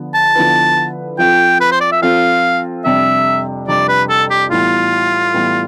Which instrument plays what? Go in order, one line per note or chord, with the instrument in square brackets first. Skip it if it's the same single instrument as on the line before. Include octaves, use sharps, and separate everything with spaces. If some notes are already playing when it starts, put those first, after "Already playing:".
Already playing: [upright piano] D3 F3 B3
[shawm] A5
[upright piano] D3 F3 B3 E4 B4
[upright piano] F3 C4 F4 A4 [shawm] G5
[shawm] B4
C5
D5
E5
[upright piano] F3 C4 F4 A4 [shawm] F5
[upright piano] F2 C3 G3 D4 [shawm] E5
[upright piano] F2 C3 G3 D4 [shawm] D5
[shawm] B4
A4
G4
[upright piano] A2 E3 G3 B3 [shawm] F4
[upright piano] A2 E3 G3 B3